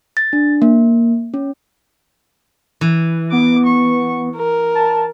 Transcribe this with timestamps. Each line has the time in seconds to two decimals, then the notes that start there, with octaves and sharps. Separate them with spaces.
0.17 A6
0.33 D4
0.62 A#3
1.34 C#4
2.81 E3
3.32 B3 D6
3.66 C#6
4.36 A#4
4.75 A5